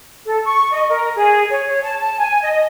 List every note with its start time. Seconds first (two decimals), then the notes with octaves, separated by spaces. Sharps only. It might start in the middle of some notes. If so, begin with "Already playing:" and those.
0.26 A4
0.45 C#6
0.72 D#5
0.89 A#4
1.16 G#4
1.50 C#5
1.68 C#5
1.83 A5
2.00 A5
2.19 G#5
2.42 D#5